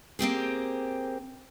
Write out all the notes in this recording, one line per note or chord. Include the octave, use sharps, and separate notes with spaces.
A#3 C4 G4 G#4